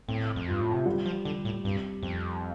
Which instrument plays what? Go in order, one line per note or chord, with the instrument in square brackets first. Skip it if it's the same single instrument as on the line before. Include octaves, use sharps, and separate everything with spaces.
[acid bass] A2 [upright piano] C4
[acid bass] F2
[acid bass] G2 [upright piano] F4
[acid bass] A2
C3
[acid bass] D3 [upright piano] G3
[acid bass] F3
[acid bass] D3 [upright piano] G4
[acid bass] A2
[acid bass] G2 [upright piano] C4
[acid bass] F2 [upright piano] C4